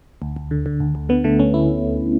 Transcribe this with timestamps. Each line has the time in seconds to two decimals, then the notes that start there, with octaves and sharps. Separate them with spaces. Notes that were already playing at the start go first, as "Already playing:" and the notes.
0.22 D2
0.36 D2
0.51 D3
0.66 D3
0.80 D2
0.95 D2
1.09 D3 B3
1.24 D3 A3
1.39 D2 C#4
1.54 E4